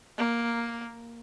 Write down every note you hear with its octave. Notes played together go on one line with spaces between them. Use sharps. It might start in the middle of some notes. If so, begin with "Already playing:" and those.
A#3